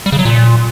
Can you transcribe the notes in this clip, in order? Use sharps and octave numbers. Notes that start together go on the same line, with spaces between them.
G3
C#3
F#3
A#2